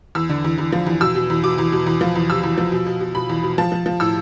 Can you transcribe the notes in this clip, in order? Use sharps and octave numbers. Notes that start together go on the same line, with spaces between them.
E2 E6
D3
E2
E2
F3
E2
B2 E6
B2
E2
B2 D6
E2
B2
E2
F3
E2
C3 E6
E2
F3
B2
B2
B2
B2 B5
E2
B2
F3 A5
F3
F3
A2 E6